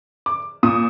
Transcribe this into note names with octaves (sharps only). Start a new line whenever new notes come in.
D6
A#2 D#6